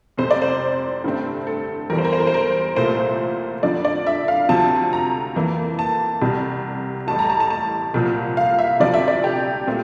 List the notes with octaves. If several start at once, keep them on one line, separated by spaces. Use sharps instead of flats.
F1 F2 C3 C5
D5
C5
G2 D3 A3 C4
A4
E2 E3 G3 A#4
C5
A#4
C5
A#4
C5
A#4
C2 A#2 A3 C5
F2 D3 F3 D5
D5
E5
F5
D2 C3 F3 A5
A#5
F2 E3 A#3
A5
C2 C3 G3
A1 A2 G3 A5
A#5
A5
A5
A5
C2 A#2 F3
F5
E5
D2 C3 F3 D5
E5
D5
G4
A#2 A3 C4